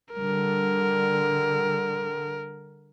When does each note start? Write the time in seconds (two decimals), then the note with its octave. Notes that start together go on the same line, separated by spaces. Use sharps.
0.13 D3 G3 A#4